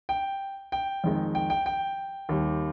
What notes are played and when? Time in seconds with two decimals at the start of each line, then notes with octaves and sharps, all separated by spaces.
0.09 G5
0.72 G5
1.04 F2 D#3 G#3
1.35 G5
1.50 G5
1.66 G5
2.29 D#2 D#3 G3